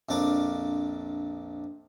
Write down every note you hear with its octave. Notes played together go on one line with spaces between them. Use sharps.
A#1 F2 D4 A#4 F5 D6